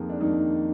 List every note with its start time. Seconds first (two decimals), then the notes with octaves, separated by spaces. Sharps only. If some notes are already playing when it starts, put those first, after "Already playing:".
Already playing: F2 D#3 A#3 G#4
0.10 D4
0.20 F2 D#3 A#3 D#4